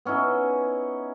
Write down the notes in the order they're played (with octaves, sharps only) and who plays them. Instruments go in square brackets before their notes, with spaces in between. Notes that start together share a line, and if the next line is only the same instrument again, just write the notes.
[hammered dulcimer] B3 C#4 D#4 E4